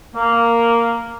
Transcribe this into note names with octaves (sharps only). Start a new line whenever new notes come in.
A#3